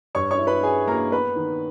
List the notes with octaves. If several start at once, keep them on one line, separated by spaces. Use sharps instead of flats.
G2 C#5 C#6
C#5 C#6
E4
B4 B5
E4 G#4 G#5
A#3 A#4 A#5
B3 B4 B5
D#3